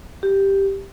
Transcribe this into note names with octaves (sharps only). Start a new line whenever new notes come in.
G4